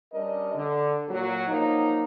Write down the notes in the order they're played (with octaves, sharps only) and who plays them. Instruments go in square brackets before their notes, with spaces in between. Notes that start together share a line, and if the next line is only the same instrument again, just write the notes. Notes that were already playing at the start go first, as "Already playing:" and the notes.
[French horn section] G3 C#4 D4 A#4 D#5
D3
A#2 F#3
F3 F#3 A#3 D#4